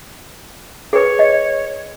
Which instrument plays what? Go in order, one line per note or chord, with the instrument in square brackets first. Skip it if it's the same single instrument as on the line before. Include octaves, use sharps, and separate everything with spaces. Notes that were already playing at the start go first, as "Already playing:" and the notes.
[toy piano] G#4 B4 [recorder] C#5
[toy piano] D#5